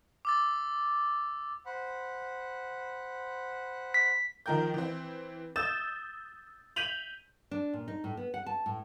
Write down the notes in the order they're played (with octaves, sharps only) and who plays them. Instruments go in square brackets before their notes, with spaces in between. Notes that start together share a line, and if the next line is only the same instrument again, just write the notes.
[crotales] D6 E6 A6
[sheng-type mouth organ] C5 F#5 B5
[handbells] B6
[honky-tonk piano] D#3 F3 A#4 G5 G6
E3 C4
D#6 E6 G6 A6 E7
G6 B6 D#7 F7 F#7
[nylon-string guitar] D4
A#2
D#4
A2
B3
F#5
A5
A2